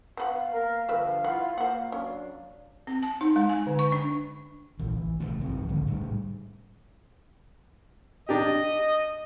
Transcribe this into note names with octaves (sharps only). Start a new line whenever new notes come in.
B3 B4 F5 F#5
A#3 A#4
G2 D3 F3 A#4 B4 E5
E4 F4 F#5
A#3 C5 F#5
F#3 C#4 D4
C4
A5
D#4
G#3
G#5
D3
C#6
D4
A#1 E3
E3
A#1 C#3 E3 A3
G#1 F3 C4
B1 D3 D#3 G#3
A2 G3
D4 G4 D#5